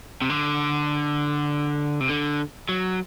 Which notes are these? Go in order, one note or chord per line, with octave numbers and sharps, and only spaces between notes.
C3
D3
C3
D3
F#3